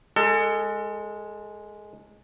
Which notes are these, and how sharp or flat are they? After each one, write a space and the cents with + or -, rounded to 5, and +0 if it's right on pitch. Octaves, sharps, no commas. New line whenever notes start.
G#3 +0 A4 +30